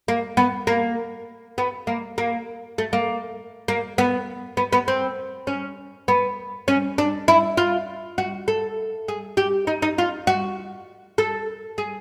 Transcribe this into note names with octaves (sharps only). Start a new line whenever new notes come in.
A#3
B3
A#3
B3
A#3
A#3
A3
A#3
A#3
B3
B3
B3
C4
C#4
B3
C#4
D4
E4
F4
F#4
A4
G#4
G4
D#4
D#4
F4
F#4
A4
G#4